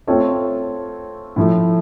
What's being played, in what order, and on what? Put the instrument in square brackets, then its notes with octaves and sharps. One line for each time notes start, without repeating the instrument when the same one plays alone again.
[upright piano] A3 C4 F4 A4 C#5
A2 F3 A3